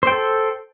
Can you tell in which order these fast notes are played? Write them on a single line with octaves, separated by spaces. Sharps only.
C5 G5 A4